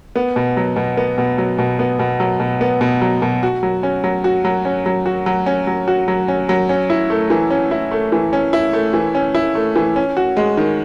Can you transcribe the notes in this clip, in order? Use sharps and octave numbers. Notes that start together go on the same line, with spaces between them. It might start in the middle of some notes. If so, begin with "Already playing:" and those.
B3
B2
F#3
B2
B3
B2
F#3
B2
B3
B2
F#3
B2
B3
B2
F#3
B2
F#4
F#3
C#4
F#3
F#4
F#3
C#4
F#3
F#4
F#3
C#4
F#3
F#4
F#3
C#4
F#3
C#4
E4
A3
E3
C#4
E4
A3
E3
C#4
E4
A3
E3
C#4
E4
A3
E3
C#4
F#4
G#3
D#3